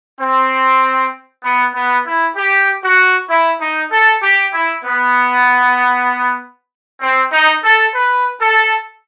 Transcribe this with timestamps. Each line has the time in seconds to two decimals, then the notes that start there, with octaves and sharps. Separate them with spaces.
0.20 C4
1.44 B3
1.74 B3
2.06 E4
2.36 G4
2.83 F#4
3.29 E4
3.61 D#4
3.91 A4
4.23 G4
4.54 E4
4.84 B3
7.01 C4
7.32 D#4
7.63 A4
7.94 B4
8.40 A4